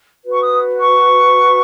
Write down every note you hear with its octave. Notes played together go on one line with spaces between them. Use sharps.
F#4 B4
C#6
D#6
C#6